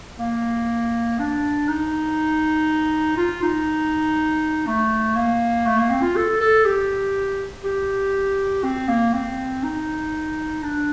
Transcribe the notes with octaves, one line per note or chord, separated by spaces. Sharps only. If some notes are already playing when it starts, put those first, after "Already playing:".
A#3
D4
D#4
F4
D#4
A3
A#3
A3
A#3
C4
F4
A4
A4
G4
G4
C4
A#3
C4
D#4
D4